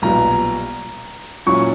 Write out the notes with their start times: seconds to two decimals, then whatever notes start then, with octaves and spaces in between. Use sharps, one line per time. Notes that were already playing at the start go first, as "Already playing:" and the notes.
0.02 B1 A#2 G3 B3 A#5
1.46 A#2 F#3 C#4 E4 C#6